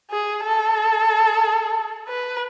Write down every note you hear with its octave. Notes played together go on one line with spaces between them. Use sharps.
G#4
A4
B4